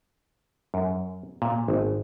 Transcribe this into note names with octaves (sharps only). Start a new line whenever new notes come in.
F#2
A#2
G#1